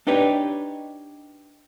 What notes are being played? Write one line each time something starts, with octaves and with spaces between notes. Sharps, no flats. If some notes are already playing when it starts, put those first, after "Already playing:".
D4 D#4 G4 B4 C#5